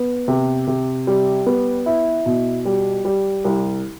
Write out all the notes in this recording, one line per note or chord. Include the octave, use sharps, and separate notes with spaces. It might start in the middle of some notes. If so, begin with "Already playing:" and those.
Already playing: B3
C3
C3
G3
B3
E4
B2
G3
G3
C2